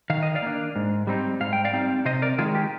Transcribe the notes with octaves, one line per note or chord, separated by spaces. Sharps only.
D#3 F5
D#5
D5 F5
A#3 D4
G#2
G3 C4 D#4
G#2 F5
G5
D5 F5
G3 C4 D#4
C3 C5 D#5
A#4 D5
D#3 G#3 F4 G#4
G4